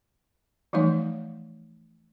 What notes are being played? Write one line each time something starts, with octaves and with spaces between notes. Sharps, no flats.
E3 F3 G3 A3 D#4 C#5